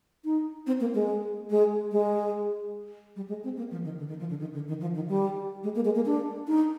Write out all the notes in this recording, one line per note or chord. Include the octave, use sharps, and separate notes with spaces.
D#4
C4
A#3
G#3
G#3
G#3
G3
G#3
C4
A#3
F3
D#3
D3
D#3
F3
D3
D#3
D3
D#3
F3
D#3
G3
G#3
A#3
G#3
A#3
D4
D#4